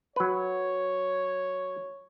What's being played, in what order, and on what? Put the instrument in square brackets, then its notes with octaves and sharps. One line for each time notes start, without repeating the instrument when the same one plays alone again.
[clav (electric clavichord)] F#3 B4 [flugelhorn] C#5